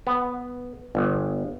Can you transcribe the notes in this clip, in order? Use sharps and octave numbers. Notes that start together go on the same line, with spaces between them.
B3
G1